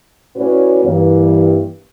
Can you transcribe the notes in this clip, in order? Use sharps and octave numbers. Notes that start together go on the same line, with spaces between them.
A2 C#4 F#4 B4 C#5 D5
G2 E3 A#3